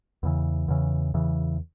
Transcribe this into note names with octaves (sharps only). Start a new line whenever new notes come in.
E2 C#3 E3
E2 C#3 E3
E2 C#3 E3